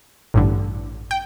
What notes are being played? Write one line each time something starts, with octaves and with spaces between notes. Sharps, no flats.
A1 G2 D3
G5